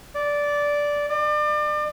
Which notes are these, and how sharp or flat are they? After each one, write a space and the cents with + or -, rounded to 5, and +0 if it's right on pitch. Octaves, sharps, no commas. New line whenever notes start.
D5 -10
D5 +35